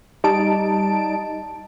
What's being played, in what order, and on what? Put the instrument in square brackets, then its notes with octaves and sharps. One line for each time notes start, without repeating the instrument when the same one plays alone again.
[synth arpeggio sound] G3 D#4 A5 D7